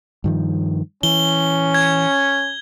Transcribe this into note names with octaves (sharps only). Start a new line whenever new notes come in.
G2 D#3 F3
E3 C#4 G7
G#6